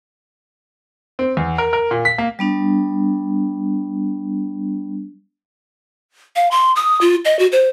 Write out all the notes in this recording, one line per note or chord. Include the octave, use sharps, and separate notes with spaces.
C4
E2
A#4
A#4
A#2
B6
A#3
G3 B3 D4
F5
C6
D#6
F4
D#5
F#4
C5